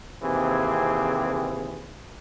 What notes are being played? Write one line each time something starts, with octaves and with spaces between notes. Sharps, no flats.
D#2 C3 E3 C4 G#4